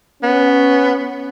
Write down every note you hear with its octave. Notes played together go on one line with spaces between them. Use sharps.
B3 C#4